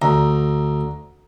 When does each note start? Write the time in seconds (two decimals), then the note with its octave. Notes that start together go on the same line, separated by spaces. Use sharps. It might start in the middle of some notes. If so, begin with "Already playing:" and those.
0.02 D2 A#5